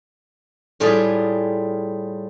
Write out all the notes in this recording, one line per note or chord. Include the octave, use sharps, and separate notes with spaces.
A2 G3 F4 G#4